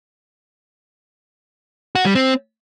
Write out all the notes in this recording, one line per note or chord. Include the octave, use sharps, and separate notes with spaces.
F#4
G3
C4